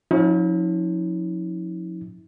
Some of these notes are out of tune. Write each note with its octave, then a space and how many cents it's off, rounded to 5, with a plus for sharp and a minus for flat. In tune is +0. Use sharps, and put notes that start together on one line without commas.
F3 +30 C#4 +0 E4 -45